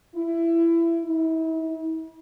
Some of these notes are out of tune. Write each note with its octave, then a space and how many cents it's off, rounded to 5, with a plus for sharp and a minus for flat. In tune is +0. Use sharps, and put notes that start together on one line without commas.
E4 +20
E4 -40